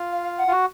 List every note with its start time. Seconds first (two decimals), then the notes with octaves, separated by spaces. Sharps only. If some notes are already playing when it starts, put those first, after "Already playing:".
Already playing: F4
0.12 F5
0.23 F5
0.38 F#5
0.48 F4
0.52 F#4